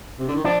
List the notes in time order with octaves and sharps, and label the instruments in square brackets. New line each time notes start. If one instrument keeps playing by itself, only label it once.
[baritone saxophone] C3
D3
D#3
[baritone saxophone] F3 [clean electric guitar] D4